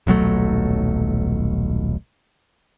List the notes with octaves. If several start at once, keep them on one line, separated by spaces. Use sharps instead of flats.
D#1 B1 F#3 A3